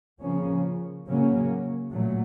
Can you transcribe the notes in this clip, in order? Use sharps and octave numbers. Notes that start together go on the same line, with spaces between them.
C#3 F3 A#3 C#4
C#3 F#3 A#3 C#4
A#2 F#3 A3